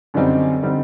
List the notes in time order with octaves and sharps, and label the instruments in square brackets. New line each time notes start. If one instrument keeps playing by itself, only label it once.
[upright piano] F#2 D3 G3 C4 D#4
D3 G3 C4 D#4